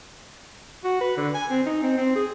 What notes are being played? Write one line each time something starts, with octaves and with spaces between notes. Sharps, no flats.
F#4
B4
D3
G#5
C4
D#4
C4
C4
G#4